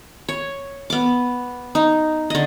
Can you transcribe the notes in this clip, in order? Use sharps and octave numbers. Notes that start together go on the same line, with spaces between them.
C#5
B3 D6
D#4
D3 D#5